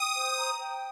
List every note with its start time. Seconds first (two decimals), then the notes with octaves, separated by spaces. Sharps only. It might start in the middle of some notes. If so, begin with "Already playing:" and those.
Already playing: G5 D#6
0.16 C5
0.38 A#5
0.60 G5